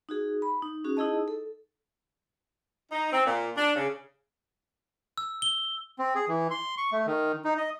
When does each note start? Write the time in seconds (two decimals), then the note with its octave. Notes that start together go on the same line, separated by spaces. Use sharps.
0.09 D#4 F#4 G#4
0.42 B5
0.62 D#4
0.84 C#4 F#4 G#4
0.97 D#4 E4 G#4 D#5 A5
1.28 A4
2.92 D#4
3.12 C4
3.26 A#2
3.57 D4
3.76 C#3
5.18 E6
5.42 G7
5.99 C4
6.15 G#4
6.28 E3
6.51 C6
6.78 C#6
6.92 A3
7.07 D#3
7.45 D#4
7.57 D#5